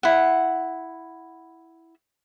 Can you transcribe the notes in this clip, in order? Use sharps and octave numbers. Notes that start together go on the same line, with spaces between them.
E4 F#5